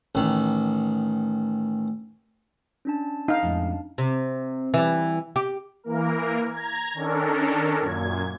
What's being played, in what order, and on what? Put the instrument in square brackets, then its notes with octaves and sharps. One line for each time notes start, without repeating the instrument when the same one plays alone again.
[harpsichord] A1 D#3
[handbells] C#4 D4 A5
[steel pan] D#4 F5
[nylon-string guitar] F2 A2 G#3
[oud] C3
E3 G3
G4
[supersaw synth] E3 A#3 A#4
A#5 G#6
D#3 C#4 D4 A4 A#4
F#2 A#2 G#6